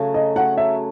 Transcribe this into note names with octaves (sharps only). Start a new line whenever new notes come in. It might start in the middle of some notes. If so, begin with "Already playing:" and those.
Already playing: C#3 F#3 A3
D#5
F#3 A3 F#5
E5